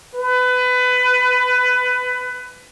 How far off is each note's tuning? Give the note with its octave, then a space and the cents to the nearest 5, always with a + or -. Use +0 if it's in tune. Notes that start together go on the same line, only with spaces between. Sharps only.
B4 +20